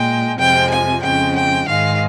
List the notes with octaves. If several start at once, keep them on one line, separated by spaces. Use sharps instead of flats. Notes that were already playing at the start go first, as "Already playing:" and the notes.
Already playing: A#2 G#3 G5
F2 C3 F3 G#3 G5
G#5
F2 C#3 G#3 G5
G5
G#2 D#3 G#3 F5